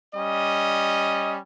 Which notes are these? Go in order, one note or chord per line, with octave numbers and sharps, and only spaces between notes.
G3 C#4 D#5